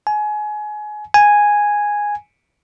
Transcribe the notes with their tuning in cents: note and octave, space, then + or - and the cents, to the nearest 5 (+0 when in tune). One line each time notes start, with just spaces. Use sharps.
G#5 +25
G#5 -5